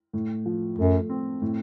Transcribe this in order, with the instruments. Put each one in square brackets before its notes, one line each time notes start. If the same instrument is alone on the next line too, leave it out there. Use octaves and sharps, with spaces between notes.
[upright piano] A2
F3
[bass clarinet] F#2 [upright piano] A3
[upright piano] C4
A2